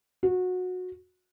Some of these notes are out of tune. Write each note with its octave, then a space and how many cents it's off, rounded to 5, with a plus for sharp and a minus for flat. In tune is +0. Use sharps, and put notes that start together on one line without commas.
F#4 -20